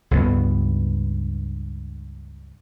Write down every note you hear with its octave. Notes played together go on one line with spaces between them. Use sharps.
C#2 G2 B3